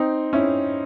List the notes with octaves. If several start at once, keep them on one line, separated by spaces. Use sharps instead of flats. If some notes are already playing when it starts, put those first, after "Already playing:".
Already playing: C4 D#4
C#4 E4